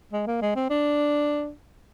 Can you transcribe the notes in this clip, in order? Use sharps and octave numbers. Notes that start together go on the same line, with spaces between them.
G#3
A#3
G#3
C4
D4